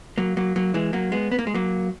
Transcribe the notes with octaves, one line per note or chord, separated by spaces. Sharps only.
F#3 A#3
F#3 A#3
F#3 A#3
E3 G#3
F#3 A#3
G#3 B3
B3
A#3
G#3
F#3 A#3